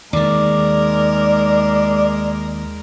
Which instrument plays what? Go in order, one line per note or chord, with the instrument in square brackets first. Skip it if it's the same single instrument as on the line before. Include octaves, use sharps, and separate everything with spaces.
[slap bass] D#2 D#3 [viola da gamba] G#3 A#4 [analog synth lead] D5